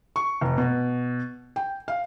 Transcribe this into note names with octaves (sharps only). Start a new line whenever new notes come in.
C#6
F1
B2
G5
F5